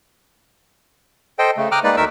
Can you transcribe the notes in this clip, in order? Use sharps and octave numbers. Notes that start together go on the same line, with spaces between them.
A4 C5 D#5 G5
C#3 A3
G5 A#5 D6 D#6 F6 F#6
G#3 A#3 D#4 B4 D5
D2 A3 D#4 A#4 E5 E6